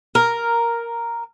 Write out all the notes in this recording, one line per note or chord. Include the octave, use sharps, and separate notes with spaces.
A#4